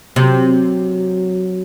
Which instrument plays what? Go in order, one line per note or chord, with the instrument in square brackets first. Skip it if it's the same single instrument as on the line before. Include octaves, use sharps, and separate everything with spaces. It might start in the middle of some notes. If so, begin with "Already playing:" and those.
[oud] C3 [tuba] F#3